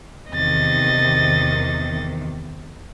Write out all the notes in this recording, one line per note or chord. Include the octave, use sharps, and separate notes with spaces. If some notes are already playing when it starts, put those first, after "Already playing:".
E2 C3 D#3 D#5 A6